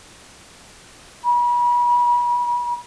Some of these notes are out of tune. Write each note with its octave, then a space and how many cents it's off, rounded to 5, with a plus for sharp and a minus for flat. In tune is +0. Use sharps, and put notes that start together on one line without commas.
B5 -40